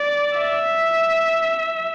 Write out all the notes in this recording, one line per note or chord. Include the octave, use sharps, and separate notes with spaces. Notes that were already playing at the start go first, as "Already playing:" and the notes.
Already playing: D5
E5